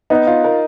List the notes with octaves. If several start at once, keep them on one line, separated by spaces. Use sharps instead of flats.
B3 D#4
F4
A#4